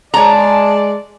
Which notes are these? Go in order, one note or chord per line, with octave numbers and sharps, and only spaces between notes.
G#3 C#5 D5 A5 A#5